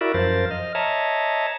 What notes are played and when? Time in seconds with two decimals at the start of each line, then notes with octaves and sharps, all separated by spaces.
0.01 E4 F#4 A#4 D5 E5
0.14 F#2 F3 A#4 C5 A6
0.51 D#5 F6
0.75 C#5 D#5 E5 A5 A#5